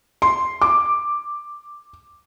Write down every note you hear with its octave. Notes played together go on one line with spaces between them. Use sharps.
C6
D6